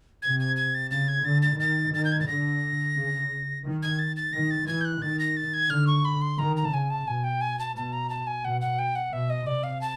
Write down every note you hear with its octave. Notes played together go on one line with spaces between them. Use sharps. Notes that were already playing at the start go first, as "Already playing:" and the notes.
C3 G#6
G#6
G#6
A6
C#3 A6
G#6
D3 A6
A6
D#3 A6
D#3 A6
G6
G#6
A6
D3 A#6
C#3
D#3
G#6
A6
A6
D#3 A#6
A6
E3 G#6
G6
F#6
D#3 A6
A#6
A6
G#6
D3 F6
C#6
B5
C6
D#3 A#5
A#5
A5
C#3 G#5
A5
B2 G#5
G5
G#5
A5
B2 A5
A#5
A5
G#5
B2 F#5
F#5
G5
F#5
B2 E5
D#5
C3 D5
F5
A5